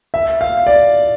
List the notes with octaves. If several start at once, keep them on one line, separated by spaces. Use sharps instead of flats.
E5
F5
D5